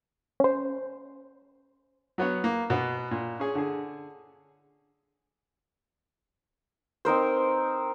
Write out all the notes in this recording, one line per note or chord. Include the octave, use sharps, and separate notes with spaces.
C#4 C5
F#3 B3 C#5 F#5
A#3
B2 B3
A#2
C#4 G#4
D3 G#4
C4 D#4 A#4 C5